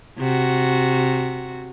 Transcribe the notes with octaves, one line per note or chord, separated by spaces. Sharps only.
C3 F#4